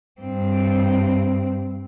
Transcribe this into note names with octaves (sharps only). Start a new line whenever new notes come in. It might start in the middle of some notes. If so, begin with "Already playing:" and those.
G2 C4